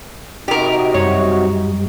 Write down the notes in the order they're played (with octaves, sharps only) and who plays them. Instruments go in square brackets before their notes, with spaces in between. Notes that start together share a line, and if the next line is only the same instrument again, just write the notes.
[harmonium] C3 D#4 F#4 [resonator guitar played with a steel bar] G4 A#4 [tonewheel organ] D#5
[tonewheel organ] F#2 G3 [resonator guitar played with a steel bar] C#5